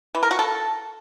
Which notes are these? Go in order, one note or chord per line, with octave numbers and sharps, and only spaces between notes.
E3
A#4
F#4
A4